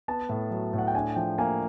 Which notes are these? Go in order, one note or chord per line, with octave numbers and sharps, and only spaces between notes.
B3 A5
A2
F#3
A2
F#5
G5
D4 G#5
F3 G5
A#3 G#5